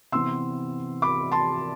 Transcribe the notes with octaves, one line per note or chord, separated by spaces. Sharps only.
C3 E3 B3 C6 E6
B5 D6
A5 C6